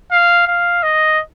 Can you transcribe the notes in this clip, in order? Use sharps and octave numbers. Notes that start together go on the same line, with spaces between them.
F5
F5
D#5